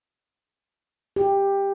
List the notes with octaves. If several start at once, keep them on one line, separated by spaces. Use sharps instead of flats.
G4